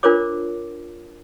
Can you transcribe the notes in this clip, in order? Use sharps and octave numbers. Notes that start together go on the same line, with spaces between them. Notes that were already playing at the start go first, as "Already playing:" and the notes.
D4 F4 A#4 C5 C#5 D6